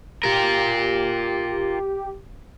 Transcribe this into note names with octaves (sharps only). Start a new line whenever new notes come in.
F4 G4 A#4